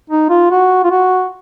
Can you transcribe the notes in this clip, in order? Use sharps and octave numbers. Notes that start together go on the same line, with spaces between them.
D#4
F4
F#4
F4
F#4